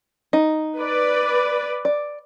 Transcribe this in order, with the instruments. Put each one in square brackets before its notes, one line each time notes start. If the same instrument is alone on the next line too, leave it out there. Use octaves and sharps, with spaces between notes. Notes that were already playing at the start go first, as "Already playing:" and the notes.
[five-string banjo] D#4
[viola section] B4 D5
[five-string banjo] D5